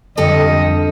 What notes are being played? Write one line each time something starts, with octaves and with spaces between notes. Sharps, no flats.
F2 D3 G3 G4 A4 D#5